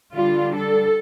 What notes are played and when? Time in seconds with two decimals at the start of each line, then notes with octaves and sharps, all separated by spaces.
0.14 D3 G3 D4 F4
0.53 A4